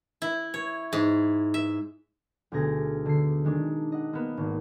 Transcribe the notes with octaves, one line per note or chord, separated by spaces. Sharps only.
E4
C#5
G#2
E5
D2 B2 G#4 A#6
D3 C7
D#3 G#3 D4
D#5 F#5
A#3 B3
G#1